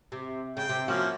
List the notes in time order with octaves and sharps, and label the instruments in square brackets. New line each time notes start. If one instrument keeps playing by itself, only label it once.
[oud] C3
[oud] C#3 [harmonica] G5
[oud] C3
[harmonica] F3 A#3 C#4 [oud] F#4